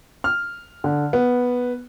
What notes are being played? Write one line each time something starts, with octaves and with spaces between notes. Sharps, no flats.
F6
D3
B3